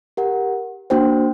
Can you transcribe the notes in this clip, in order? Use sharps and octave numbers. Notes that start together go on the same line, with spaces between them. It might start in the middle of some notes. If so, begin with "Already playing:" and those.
G4 A#4 F#5
A#3 D4 F#4 C5 G5